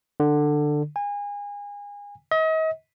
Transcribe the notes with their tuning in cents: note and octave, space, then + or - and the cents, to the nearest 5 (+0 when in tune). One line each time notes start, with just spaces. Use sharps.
D3 +15
G#5 -30
D#5 +40